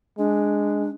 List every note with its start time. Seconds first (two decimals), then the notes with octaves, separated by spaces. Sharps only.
0.18 G#3 D4